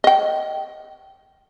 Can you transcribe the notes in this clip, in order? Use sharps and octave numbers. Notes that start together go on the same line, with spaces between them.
D#5 G5